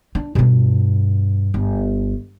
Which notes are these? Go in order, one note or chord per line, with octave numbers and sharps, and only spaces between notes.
D4
G2 B2
G1